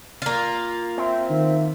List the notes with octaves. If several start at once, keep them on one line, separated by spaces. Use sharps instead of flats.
A#3 F4
C4 E5
D#3 E5